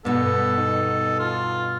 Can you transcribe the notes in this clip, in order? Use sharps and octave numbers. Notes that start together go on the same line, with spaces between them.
G2 B2 B3 A4
D#4
F4